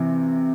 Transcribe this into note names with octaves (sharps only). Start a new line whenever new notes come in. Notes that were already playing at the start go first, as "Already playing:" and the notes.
Already playing: C3 E3